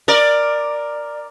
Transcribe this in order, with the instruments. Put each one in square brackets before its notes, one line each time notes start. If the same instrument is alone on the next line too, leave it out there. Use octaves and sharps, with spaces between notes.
[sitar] A#4 D5